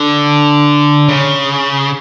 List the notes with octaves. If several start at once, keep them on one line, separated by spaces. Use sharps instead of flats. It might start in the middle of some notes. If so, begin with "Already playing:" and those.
Already playing: D3
C#3